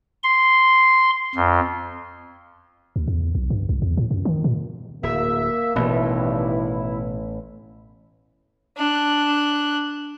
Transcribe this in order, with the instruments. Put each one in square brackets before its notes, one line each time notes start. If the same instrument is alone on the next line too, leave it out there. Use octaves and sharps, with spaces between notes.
[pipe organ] C6
F2
[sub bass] D2
E2
B1
G2
C2
E2
A2
F#2
D#3
A#2
[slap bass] D1 [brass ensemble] A#3 [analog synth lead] E5
[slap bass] A1 [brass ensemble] G2 D#3 [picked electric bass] B2 [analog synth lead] E4
[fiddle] D4 F#6